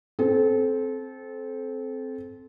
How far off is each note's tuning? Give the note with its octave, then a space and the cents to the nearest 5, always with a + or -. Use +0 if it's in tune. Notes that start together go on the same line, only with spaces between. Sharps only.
C4 +0 A4 -25